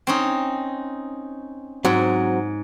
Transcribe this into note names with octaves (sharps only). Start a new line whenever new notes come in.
C4 C#4 D#4
G#2 F#3 C4 F#4